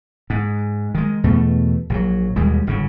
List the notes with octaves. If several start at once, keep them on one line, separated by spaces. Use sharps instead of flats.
G#2
D#3 G#3
E2 B2 A3
A#1 F3 F#3
D#2 B2 G3 G#3
G1 G#2 C#3